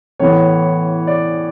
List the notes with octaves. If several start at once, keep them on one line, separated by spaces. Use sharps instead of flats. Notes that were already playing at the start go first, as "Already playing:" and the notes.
A2 E3 B3 C#5
D5